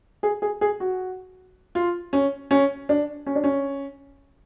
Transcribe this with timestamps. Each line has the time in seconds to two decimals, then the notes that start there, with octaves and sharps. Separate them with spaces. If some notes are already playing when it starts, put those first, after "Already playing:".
0.23 G#4
0.42 G#4
0.61 G#4
0.80 F#4
1.75 F4
2.13 C#4
2.51 C#4
2.89 D4
3.26 C#4
3.36 D4
3.44 C#4